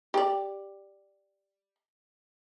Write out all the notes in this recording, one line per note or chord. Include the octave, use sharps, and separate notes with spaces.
G4 D5